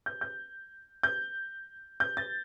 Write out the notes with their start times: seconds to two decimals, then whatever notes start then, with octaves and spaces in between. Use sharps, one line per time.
0.06 G6
0.21 G6
1.03 G6
2.00 G6
2.17 A6